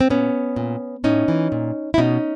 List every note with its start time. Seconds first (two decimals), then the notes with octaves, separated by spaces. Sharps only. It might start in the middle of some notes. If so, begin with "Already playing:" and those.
0.01 C4
0.10 A#2 B3 C#4
0.56 A#2
1.04 A2 C#4 D#4
1.28 E3
1.52 A#2
1.94 E4
1.98 B2 C#4 D#4